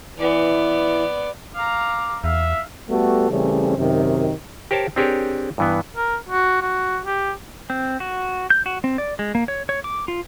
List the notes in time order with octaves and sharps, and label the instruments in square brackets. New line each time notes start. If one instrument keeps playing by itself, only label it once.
[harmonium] E3 [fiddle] B3 D5
[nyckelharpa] F5 A#5 [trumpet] D6
[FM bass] E2 [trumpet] E5 [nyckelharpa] F5
[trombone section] G3 A3 B3 F#4 G4 A4
C#3 E3 G3 A3 C4 C#4
F#2 C3 D#3
[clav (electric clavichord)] G4 A#4 C5 C#5 A5
C4 D4 G4 G#4 A#4 C#5
G2 E3 B3
[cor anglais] A#4
F#4
F#4
G4
[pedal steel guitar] C4
F#4
G6
F#4
C4
D5
G#3
A#3
C#5
C#5
D6
F4